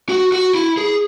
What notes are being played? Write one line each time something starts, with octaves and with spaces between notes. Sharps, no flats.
F#4
F#4
E4
G#4